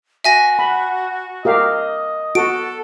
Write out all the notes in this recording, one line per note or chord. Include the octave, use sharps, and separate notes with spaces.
F#4 E5 G#5 A#6
F#5 B5
G4 A#4 D#5 F5
F#4 A4 D7